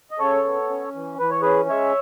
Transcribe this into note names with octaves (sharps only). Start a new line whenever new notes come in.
D#5
C#3 A4 C#5
B3
C#4
E3
E3 B4
C#5
C#4 G#4 B4
G#3 C#5 E5